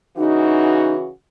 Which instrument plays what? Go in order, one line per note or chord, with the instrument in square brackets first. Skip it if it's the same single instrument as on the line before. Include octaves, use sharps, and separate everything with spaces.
[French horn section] C#3 E3 F#4 [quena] D#4